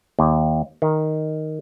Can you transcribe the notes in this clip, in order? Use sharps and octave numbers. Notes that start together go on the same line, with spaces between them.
D#2
D#3